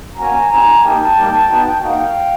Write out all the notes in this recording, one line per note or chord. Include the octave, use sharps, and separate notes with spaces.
A#3 C#4 F#4 G#5 A#5
C4 D#4 G4 G#5 A#5
A#3 D#4 G4 G5 A5
G3 A#3 D#4 G4
B3 D#4 F#4
A#3 D#4 F#4 F5 G5